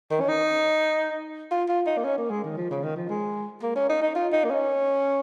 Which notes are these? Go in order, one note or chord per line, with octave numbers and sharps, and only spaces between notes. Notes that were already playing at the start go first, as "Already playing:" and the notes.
D#3
C#4
D#4
F4
F4
D#4
A#3
C#4
A#3
G#3
D#3
F3
C#3
D#3
F3
G#3
A#3
C#4
D#4
D#4
F4
D#4
A#3
C#4